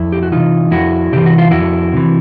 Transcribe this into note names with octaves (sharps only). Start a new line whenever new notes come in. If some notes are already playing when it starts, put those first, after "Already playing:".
Already playing: F2 E4
G4
F#4
C3 E3 D#4 F4
F2 E4 F#4
C3 E3 G4
F#4
F4
F2 E4 F#4
C3 E3